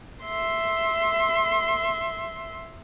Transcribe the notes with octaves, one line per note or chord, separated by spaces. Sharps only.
E5 C6